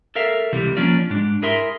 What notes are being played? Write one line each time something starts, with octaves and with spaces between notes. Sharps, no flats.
A4 A#4 E5 F5
C#2 C3 E3 G3
F3 A#3 C#4 D4 F4 D5
G#2 G#3 D4
E4 G#4 A#4 E5 C6